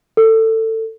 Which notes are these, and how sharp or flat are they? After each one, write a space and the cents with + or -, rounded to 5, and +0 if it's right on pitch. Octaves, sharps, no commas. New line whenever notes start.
A4 +20